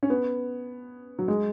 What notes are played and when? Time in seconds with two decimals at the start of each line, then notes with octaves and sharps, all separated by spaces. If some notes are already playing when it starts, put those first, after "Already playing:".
0.03 C#4
0.10 B3
1.19 F#3
1.28 G#3